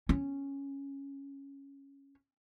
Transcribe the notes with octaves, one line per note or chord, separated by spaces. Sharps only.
C#4